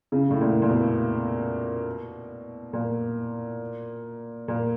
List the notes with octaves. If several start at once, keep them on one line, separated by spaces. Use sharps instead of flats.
C#3
A2
A#2
A#2
B2
A#2
A#2